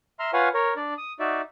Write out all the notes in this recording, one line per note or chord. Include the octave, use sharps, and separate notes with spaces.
E5 A#5 C6 F6
F4 B4 C#5 F5 F#5 G#5
A#4 C#5
D4 D5
D#6
D#4 F#4 D5 E5